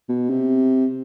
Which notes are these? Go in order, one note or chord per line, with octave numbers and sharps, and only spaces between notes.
B2
C3